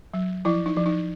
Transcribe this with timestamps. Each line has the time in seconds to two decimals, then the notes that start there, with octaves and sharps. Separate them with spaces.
0.14 F#3
0.45 F3 E4
0.66 D#4
0.77 F3
0.86 D#4